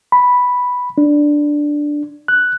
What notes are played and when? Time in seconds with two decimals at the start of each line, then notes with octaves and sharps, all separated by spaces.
0.12 B5
0.98 D4
2.28 F#6